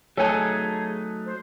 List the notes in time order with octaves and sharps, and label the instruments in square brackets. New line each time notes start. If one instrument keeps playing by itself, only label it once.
[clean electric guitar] F#3 A3 D#4 [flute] G#4 [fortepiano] A4 G#5 [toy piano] C#5 A5
[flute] C5